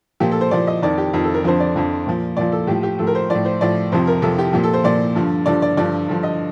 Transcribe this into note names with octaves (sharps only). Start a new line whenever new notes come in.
A#2 F3 G4
A4
C5
A#2 F3 D5
D#5
F2 D#3 D5
G4
F2 D#3 F4
A4
A#4
F2 D3 F3 C5
D5
F2 D3 F3
A#2 F3
A#2 F3 D5
A4
A2 F3 G4
G4
A2 F3 A4
A#4
C5
A2 F3 D5
C5
A2 F3 D5
F2 C3 F3 C5
A#4
F2 C3 F3 A4
G4
A#2 F3 G4
A4
C5
A#2 F3 D5
G2 D3 F3
G2 D3 F3 D5
D5
G2 D3 F3 D5
G2 D3 F3
D#5